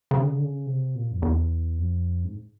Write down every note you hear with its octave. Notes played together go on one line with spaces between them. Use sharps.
C#3
D3
C#3
D3
C#3
C3
A#2
F2
E2
F2
G#2